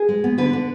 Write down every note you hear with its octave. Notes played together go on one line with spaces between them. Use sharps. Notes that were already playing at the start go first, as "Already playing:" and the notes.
Already playing: G#4
G#3
B3
D3 B4
D3